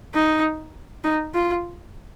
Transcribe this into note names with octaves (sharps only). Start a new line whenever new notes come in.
D#4
D#4
F4